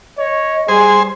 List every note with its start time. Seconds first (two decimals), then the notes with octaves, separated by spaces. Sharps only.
0.18 C#5 D#5
0.68 G3 G#4 C5 G#5